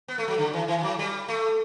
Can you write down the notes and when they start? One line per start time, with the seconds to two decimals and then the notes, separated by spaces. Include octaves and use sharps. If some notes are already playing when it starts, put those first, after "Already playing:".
0.08 B3
0.18 A3
0.28 F#3
0.38 D3
0.53 E3
0.68 E3
0.79 E3
0.83 F#3
0.99 G3
1.28 A3